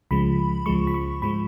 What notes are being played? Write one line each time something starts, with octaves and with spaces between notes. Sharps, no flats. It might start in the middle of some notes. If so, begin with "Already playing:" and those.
C#2 C#3 F3 G#3 B5
C#2 C#3 F3 G#3 C#6
B5
C#6
G#2 F3 G#3 B5